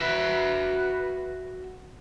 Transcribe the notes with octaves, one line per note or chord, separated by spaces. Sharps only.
F#4 B4 E5